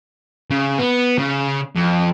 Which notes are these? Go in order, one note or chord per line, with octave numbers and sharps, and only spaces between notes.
C#3
B3
C#3
F2